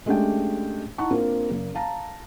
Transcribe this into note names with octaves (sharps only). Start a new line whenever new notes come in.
G#3 A3 C#4 D4 G4 G5
D#4 E4 F#5 A5 A#5 C#6
A#3 C4 D4 F4 A#4
F#1 A#3
F5 A5 A#5